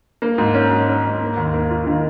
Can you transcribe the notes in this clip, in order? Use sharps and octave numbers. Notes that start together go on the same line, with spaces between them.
A#3
G#2
C#4
G#2
C#4
G#2
A#3
D#2
A#3
F4
D#3